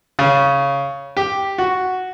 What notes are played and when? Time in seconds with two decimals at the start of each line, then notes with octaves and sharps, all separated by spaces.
0.19 C#3
1.17 G4
1.58 F#4